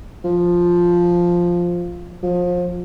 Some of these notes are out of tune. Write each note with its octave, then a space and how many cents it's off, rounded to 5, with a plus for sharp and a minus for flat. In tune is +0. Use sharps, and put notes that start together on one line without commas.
F3 +0
F3 +30